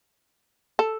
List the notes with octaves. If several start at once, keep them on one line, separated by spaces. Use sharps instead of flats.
A4